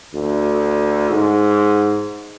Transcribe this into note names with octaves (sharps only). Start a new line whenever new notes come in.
D2
G#2